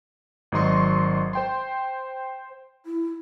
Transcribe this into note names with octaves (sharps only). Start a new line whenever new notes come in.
G#1 F#3 D#5 C6 C#6
C5 G5 C6
E4